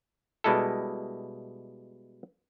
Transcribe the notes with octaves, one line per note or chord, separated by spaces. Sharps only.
B2 G3 G#3 E4 A4